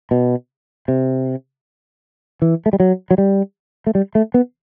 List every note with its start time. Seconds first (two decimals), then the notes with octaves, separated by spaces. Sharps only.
0.11 B2
0.88 C3
2.42 E3
2.66 A3
2.73 G3
2.80 F#3
3.11 F#3
3.18 G3
3.87 A3
3.95 G3
4.15 A3
4.34 B3